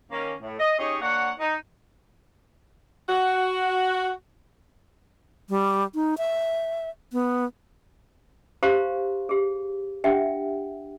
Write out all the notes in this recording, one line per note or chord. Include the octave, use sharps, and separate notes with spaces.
D#3 A#3 C#4
A2
D#5
C#4 D#4 G4 G#4 C#5 D#5
A#3 D4 C#5 F#5
D#4
F#4
G3
D#4
E5
B3
G4 C5 F5 A#5 C6 C#6
G4 G#4
D4 G4 E5 F#5 G5